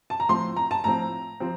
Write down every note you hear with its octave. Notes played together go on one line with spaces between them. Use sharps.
A5
A#5
A2 F3 C4 C6
A#5
A5
A2 F3 C4 A#5
F3 C4